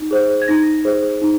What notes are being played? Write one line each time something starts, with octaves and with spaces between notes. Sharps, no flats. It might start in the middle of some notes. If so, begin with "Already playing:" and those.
Already playing: D#4
G#4 C5
G#6
D#4 A#6
G#4 C5
D#4